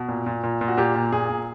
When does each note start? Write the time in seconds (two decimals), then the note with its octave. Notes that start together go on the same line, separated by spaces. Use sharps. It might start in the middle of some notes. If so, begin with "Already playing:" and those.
Already playing: B2
0.09 A#2
0.26 A#2
0.44 A#2
0.61 A#2
0.68 F#4
0.77 A#2 G4
0.95 A#2
1.12 A#2 G#4
1.29 A#2